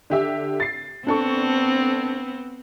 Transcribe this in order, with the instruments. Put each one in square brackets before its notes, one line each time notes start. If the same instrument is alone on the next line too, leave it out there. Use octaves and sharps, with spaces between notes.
[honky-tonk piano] D3 G4 E5
A6 C7
[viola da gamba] B3 C4 [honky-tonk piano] D4 A4 C#6